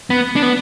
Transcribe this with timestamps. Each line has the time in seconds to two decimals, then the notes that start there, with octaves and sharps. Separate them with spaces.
0.10 B3
0.36 D4
0.42 B3